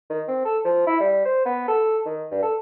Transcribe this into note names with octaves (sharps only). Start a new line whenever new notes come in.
D#3
C4
A4
F3
E4
G3
C5
B3
A4
D#3
G2
A4